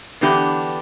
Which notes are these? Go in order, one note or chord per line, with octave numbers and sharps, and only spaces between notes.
D3 E3 B3 D4 G4